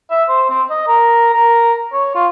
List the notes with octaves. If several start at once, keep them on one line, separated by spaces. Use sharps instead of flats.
E5
C5
C4
D#5
A#4
A#4
C#5
F4